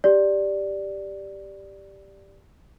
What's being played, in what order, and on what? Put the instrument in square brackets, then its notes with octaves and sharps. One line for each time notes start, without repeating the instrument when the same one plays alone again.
[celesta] G4 D5